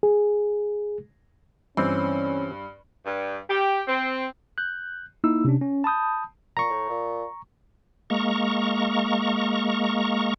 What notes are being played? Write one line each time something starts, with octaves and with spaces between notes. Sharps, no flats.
G#4
G2 E3 C4 C#4
G2
G4
C4
F#6 G6
A#3 D#4 E4 E6
C3 C#4 D4
C#4
A5 B5 D#6 G6
A#2 A#5 C#6
A2
A#2
G#3 A#3 A#5 C#6